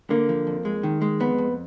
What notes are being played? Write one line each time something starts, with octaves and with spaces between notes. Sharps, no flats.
D3 A#3
F3
F2
G#3
D#3
G#3
F2 B3
F2